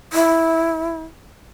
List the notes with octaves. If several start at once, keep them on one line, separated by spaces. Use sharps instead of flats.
E4